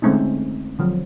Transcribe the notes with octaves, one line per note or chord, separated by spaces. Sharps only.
D3 G#3 A3 C4 C#4 D#4
D3 F3 F#3